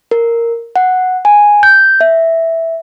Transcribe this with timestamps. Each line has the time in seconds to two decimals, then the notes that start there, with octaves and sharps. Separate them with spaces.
0.11 A#4
0.76 F#5
1.25 G#5
1.63 G6
2.01 E5